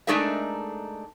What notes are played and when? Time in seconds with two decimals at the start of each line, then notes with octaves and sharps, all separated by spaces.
0.07 G#3 A3 D4 D#4 A#4 E5